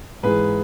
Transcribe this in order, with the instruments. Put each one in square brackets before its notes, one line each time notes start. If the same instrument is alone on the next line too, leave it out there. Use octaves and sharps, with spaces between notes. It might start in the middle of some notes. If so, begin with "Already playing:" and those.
[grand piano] G#2 E3 G#4 B4